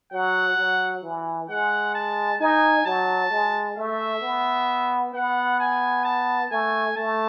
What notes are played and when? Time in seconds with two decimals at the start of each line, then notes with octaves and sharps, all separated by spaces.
0.12 F#3 F#5
0.58 F#3
1.03 E3
1.49 G#3 F#5
1.94 A5
2.40 D#4 G#5
2.85 F#3 A5
3.31 G#3
3.77 A3 E5
4.22 B3
5.14 B3 F#5
5.60 G#5
6.04 A5
6.51 A3 G#5
6.96 A3 A5